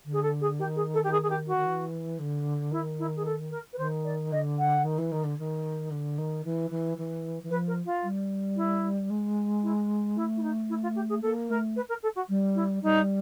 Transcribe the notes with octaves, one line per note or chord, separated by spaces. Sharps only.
D3
G#4
A4
G#4
D#3 G4
G#4
A4
G4
G#4
G#4
G4
F#4
D#3
E3
D3
D#3 E4
E4
G#4
A4
A#4
B4
D#3 C5
D5
D3 D#5
F#5
D#3
E3
D#3
D3
D#3
D3
D#3
E3
E3
E3
E3
F3 B4
A#4
F4
G3
E4
G#3
E4
A3 E4
E4
D#4
E4
F4
G4
G#4
A#3 A4
A3 A#4
B4
A#4
A4
F#4
G3
E4
G3 D#4